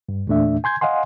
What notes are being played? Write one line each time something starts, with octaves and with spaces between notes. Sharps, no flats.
G2
E2 A#2 A3 D4 E5
G#5 C6 G6 G#6
D#5 F5 F#5 G#5 C6